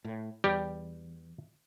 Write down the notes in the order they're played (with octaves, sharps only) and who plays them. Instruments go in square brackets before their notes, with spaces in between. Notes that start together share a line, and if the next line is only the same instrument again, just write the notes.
[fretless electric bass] A2
[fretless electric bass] E2 [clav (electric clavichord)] G3 G4